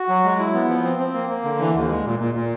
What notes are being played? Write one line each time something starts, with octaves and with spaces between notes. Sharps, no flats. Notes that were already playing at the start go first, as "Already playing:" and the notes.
Already playing: F#4
F#3
G#3
E4
B3
F3
C4
C4
A#3
A#3
D3
E3
D#2
G#3
A#2
A#2
A#2